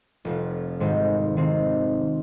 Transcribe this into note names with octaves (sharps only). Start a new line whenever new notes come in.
F1 F2 C3
G#1 G#2 D#3 C4
C3 D#3 C4